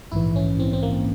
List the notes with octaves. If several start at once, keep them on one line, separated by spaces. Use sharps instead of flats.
A#1 G#2 E3 E4
C#4
C4
C4
A#3